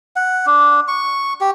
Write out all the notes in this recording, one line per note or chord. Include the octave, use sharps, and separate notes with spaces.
F#5
D4
C#6
G4